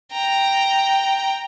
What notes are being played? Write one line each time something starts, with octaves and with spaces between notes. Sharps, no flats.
G5 A#5